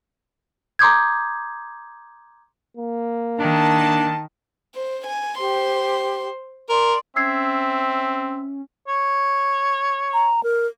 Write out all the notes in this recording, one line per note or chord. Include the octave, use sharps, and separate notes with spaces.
A#5 C6 D6 D#6 G6 G#6
A#3
D#3 D4 A5
C5
G#5
G4 C5 C6
A#4 D5 C6
C4 C#4 E5 E6 G#6 C7
C#5
A#5
A#4